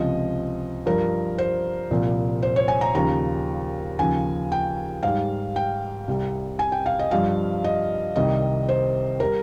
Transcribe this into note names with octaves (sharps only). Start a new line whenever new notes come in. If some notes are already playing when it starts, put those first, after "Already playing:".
Already playing: C#2 C3 F3 D#5
G2 F3 A#4
C5
C2 A#2 F3
C5
C#5
G#5
A#5
D#2 C#3 F3 A#5
D#2 C#3 F3 G#5
G5
G#2 G3 F5
G5
C2 C3 G3
G#5
G5
F5
D#5
G2 F3 F5
D#5
C2 C3 D#3 G3 D#5
C5
G3 A#4